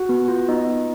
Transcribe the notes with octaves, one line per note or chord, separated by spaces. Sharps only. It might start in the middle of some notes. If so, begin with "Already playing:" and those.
Already playing: F#4 F#5
B3
F4
B3 D#4 D#5
B3